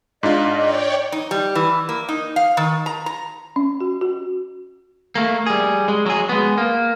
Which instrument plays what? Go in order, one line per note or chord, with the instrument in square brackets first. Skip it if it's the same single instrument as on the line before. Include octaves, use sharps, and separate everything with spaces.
[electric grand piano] G#2 D4 F4 [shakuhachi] D#5
[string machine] C#5 D5 G5
[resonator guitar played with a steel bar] D#4
G3
E3
A#3
D#4
F5
D#3
A#5
A#5
[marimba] C#4
F#4
F#4
[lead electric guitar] A3 A#3
G3 G#4
G#3
F#3 G#4
G#3 B3
A#3